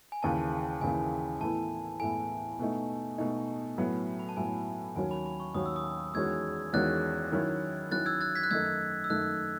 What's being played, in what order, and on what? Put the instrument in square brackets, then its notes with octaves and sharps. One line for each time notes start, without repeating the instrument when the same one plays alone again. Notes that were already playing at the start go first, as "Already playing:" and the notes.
[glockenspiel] G#5
[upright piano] D#2 C#3 E3 [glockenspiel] A5
[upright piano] D#2 C#3 E3 [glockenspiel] G#5
[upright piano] A2 E3 B3 E4 A4 [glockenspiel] A5
[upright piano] A2 E3 B3 E4 A4 [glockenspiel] G#5
[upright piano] B2 A3 D#4
B2 A3 D#4
A2 F#3 B3
[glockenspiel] B5
A5
[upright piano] A2 F#3 B3 [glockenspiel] G#5
[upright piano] D#2 D#3 F#3 C#4 F#4 [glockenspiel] G#5
[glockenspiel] B5
B5
C#6
[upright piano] D#2 D#3 F#3 C#4 F#4 [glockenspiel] D#6
[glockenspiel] E6
D#6
[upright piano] E2 D#3 G#3 C#4 F#4 [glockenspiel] E6 G#6
[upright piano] E2 D#3 G#3 C#4 F#4 [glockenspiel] F#6 A6
[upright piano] D#3 F#3 C#4 E4
[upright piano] D#3 F#3 C#4 E4 [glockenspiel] F#6 A6
[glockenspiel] E6 G#6
F#6 A6
G#6 B6
F#6
[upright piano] F#2 D#3 A3 D#4 A4 [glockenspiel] E6 G#6
[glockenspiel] E6
[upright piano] F#2 D#3 A3 D#4 A4 [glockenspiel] F#6